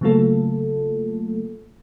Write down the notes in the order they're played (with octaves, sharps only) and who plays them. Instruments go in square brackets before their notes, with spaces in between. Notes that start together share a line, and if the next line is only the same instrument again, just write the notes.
[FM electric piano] C#3 F#3 A3 A#3 F4 A4